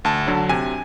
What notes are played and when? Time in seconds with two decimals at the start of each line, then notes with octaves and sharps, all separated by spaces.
0.05 D2 A5
0.27 D3 F#3
0.49 C3 G#5